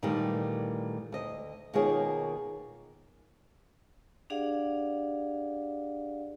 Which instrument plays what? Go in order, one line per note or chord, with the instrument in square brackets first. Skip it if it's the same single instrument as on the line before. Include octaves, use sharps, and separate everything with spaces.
[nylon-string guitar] A#2 D#3 E3 G3 A3
D2 D#5
B2 D#3 A#3 F4 G#4 C#5
[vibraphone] D4 G4 G#4 D5 F5 F#5